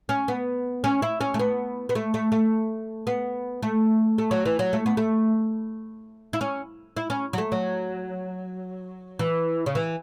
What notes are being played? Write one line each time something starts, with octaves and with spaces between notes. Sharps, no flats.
C#4
B3
C#4
E4
C#4
A3
B3
B3
A3
A3
A3
B3
A3
A3
F#3
E3
F#3
A3
B3
A3
E4
C#4
E4
C#4
F#3
A3
F#3
E3
C#3
E3